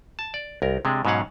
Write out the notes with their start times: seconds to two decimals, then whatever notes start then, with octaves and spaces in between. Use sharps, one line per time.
0.19 A5
0.34 D5
0.62 C2 A#4
0.85 C3 G#3 D4
1.05 G#2 B2 F#3 C#4 F5 F#5